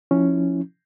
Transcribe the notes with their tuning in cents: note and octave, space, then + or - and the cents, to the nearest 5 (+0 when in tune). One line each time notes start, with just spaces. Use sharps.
F3 +0 C#4 +0 E4 -20